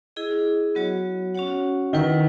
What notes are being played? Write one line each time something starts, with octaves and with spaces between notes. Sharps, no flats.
E4 G#4 D#5
F#3 B3 F#4 C#5
C#4 F#4 C#5 F#5
D#3 E4 B4 F#5